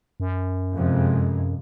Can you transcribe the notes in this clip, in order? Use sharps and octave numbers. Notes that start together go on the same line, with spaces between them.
F#2
F2 C3 G#3